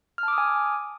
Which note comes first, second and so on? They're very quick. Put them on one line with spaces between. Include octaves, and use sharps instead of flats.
F6 A5 D6 D#6 G#5